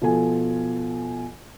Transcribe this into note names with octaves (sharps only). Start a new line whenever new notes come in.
B2 F3 A4 G#5